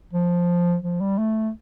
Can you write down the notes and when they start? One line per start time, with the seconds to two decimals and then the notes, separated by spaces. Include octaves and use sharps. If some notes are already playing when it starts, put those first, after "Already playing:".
0.13 F3
0.83 F3
1.01 G3
1.18 A3